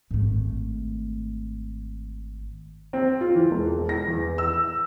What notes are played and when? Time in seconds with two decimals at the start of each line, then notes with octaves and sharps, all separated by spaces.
0.11 G#1 A3
2.93 C4
3.21 F4
3.35 E3
3.51 E1
3.89 A#6
4.07 E2
4.38 E6